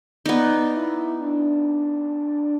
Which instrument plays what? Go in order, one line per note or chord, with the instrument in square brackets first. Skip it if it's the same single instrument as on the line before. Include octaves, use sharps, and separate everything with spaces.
[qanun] B3 D#4 [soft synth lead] D5
[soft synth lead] E4
D4